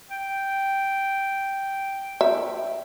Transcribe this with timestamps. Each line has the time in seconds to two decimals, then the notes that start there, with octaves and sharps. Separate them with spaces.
0.10 G5
2.21 E5